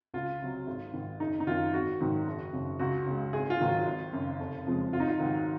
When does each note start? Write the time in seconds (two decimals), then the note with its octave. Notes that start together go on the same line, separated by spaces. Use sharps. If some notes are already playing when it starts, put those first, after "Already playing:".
0.14 C#2 F4
0.40 C3 F#3
0.67 G#1
0.93 G#2 D#3
1.20 F#1 D#4
1.40 D#4
1.47 F#2 D#3 F4
1.73 G#1 F#4
2.00 G#2 D#3 F#3
2.27 F#1
2.53 F#2 C#3
2.79 C#2 F#4
3.06 C#3 G#3
3.33 G#1 G#4
3.50 F4
3.59 G#2 D#3 F#3
3.69 F4
3.86 G#1
4.13 F#2 C#3
4.39 F1
4.66 F2 C#3 F3 G#3
4.93 G#1 F4
5.00 D#4
5.08 F4
5.19 G#2 D#3 F#3